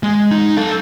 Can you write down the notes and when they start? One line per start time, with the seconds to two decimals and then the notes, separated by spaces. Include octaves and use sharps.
0.03 G#3
0.31 D#4
0.57 A4 F5